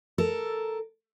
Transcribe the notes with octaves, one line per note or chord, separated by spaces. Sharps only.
A4 A#4